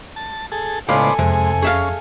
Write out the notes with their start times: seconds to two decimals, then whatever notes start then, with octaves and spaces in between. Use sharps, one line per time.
0.16 A5
0.52 G#4 A4
0.89 C#2 A2 B3 A4 C5 D5 F5 G#5
1.19 F2 C3 G#3
1.62 C#4 G#4 E5 F5